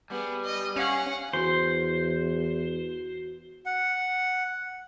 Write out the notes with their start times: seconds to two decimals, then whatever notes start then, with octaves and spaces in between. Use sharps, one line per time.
0.10 G3 B3 G#4
0.44 D#5
0.76 C#4 F5 F#5
1.33 E2 F#4 C5
3.66 F#5